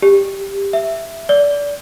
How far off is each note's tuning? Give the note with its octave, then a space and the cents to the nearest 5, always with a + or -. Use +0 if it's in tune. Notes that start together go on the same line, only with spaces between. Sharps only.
G4 +10
E5 +5
D5 -25